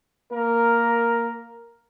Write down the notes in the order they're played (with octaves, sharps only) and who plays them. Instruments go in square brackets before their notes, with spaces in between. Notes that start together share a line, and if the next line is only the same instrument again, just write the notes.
[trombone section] A#3 A#4